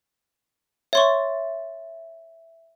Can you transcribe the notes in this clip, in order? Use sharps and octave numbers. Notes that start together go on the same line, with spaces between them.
C#5 E5 C6 C#6